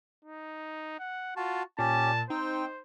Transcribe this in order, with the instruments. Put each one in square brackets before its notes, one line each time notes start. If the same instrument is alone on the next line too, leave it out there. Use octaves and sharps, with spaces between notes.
[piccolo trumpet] D#4
F#5
[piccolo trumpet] F4 [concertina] F#4 A5
[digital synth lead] A#2 [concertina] C#4 G4 [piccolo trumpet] A5
[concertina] C4 G5 [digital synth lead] D#4 [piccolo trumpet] C5